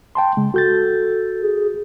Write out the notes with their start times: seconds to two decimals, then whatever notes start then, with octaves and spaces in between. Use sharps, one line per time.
0.15 G5 A5 C6
0.37 C#3 G#3
0.54 F#4 A4 G6 A6
1.43 G#4